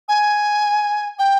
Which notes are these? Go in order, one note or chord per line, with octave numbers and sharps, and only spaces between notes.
G#5
G5